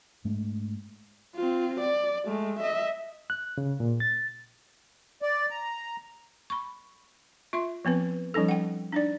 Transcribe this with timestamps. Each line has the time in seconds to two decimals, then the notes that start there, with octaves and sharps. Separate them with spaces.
0.25 G#2 G#3 A3 D4
1.35 C4 F4
1.81 D5
2.26 G#3 A3
2.60 D#5 E5
3.30 F#6
3.58 C#3
3.80 A#2
4.00 A6
5.22 D5
5.50 A#5
6.50 B5 C#6
7.53 F4 E5 C6
7.85 F3 B3 C4 B4
8.34 F3 G3 C#4 D#4 A4
8.48 F#5 G5
8.92 D4 D#4 D5